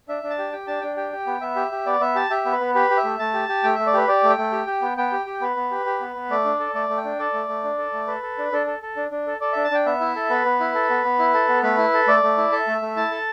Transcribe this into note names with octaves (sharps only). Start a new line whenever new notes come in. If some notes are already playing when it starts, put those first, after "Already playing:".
D4 E5
D4
A5
G4
G4 G5
D4 A5
D4 G5
G4 G5
G4
B3
B3 E5
G4
G4
B3 D5
B3 E5
G4 A5
G4 E5
B3
B4
B3
G4 B4
G4
E5
A3
A3 A5
G4
G4
A3 G5
A3 E5
D5
G4 B4
G4 D5
A3
G5
A3
G4
G4
B3
B3 G5
G4
G4
B3 B4
B3
G4
G4
B3
B3
A3 D5
D4
A4
A3 D5
A3
G5
D4
A4 D5
A3
A3
D4
A4
A3
A4 B4
A4
D4
D4 A4
A4
A4
D4
D4
A4
A4 D5
D4 E5
A5
D4 G5
B3 E5
E4
A4
B3 B4
B3
E4
A4
B3
B3
E4
A4
B3
A3 B4
E4
A4
A3 D5
A3
E4
A4 E5
A3
A3
E4 A5
A4